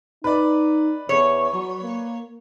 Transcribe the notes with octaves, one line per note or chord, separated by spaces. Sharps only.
D#4 B4 D5
E2 C#5
F#3
A#3